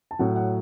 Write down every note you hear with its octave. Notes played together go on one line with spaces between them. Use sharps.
A5
A2 F#3 F#5
F#5